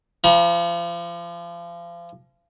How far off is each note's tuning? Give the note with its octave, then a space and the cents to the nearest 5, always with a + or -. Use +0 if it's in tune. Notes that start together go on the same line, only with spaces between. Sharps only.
F3 -30 A#5 +40